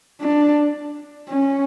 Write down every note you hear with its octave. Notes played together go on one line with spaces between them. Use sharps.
D4
C#4